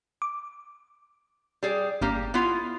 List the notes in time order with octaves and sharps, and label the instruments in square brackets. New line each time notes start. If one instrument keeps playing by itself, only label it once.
[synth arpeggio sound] D6
[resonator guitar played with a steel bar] G3 G#4 D5
[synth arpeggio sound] G1 [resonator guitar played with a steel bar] G3 A#3 G4
[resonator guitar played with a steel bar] B3 E4 F4